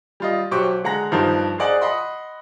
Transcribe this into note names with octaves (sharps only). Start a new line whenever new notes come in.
G3 F4 D#5
B1 F#3 G4 C5 C#6 D6
D3 G#3 F#5 A#5 A#6
G1 G2 F3 D#4 A#4 C5
G#4 A#4 C5 D5 D#5 F#5
D#5 F#5 B5 C6